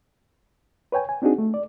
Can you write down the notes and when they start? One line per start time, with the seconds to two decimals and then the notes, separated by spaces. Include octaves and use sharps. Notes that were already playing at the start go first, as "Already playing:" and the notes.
0.92 B4 C#5 G5 G#5
1.09 G#5
1.22 C4 D4 D#4 F#4 G#4
1.38 A3
1.54 D5